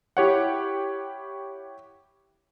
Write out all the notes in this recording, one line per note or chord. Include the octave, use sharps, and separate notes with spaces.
E4 G4 C#5 F#5